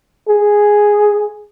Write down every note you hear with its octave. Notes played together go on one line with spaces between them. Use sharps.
G#4